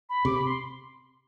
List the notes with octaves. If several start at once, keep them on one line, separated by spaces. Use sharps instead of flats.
B5
C3 D6
B5
C6